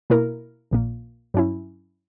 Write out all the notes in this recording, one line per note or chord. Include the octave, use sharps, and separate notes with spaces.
B2 A#3 E4 A#4
A#1 A#2 A#3
G2 F#3 C#4 E4